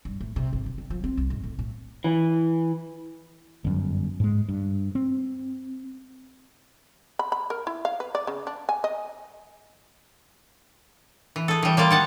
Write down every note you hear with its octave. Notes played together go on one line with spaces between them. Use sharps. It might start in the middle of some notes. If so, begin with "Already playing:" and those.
G2
A2
C3
G#1
C#3
D3
F3
C4
C2
G#2
A2
A2
E3
G1 F#2
G#2 G#3
G2
C4
B5
B5
A#4
E4
F5
B4
D5
C#3
D4
G#5
D#5
E3
G#4 A4
E3 G3
G3 A#3 F4 D5
D#3 F#5 A5